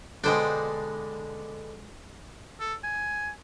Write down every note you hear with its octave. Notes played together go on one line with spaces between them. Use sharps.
B2 D3 G#3 D4 C5 G5
A4
G#5